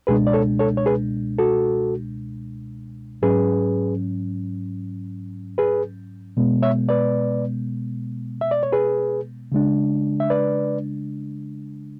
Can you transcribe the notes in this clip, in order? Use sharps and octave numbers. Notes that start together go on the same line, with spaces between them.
C#2 B2 G#3 D4 G#4 B4
D5
A4 C#5
A4 C#5
C#5
G#4 B4
F#4 A4
G#2 F#3 C#4 G#4 B4
G#4 B4
B2 G#3 B3
C#5 E5
B4 D5
E5
D5
C#5
G#4 B4
C#3 G#3 D4
E5
B4 D5